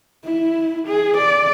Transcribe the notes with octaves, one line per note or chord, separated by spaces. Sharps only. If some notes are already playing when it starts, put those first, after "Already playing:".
E4
G#4
D5